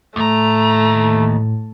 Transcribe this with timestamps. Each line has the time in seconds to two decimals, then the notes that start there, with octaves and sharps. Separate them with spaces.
0.16 D#2 A2 A3 A#5